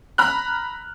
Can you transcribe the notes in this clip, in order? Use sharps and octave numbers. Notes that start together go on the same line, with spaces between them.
A#5 B5 F6 F#6